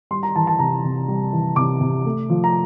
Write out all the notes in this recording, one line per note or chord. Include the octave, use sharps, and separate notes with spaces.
G3 C6
A#5
E3 A5
A5
C3 A#5
C3
G3
E3
C3 D6
C3
A3
F3
A#5